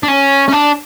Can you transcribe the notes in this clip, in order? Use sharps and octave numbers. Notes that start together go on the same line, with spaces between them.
D4
C#4
C#4
D4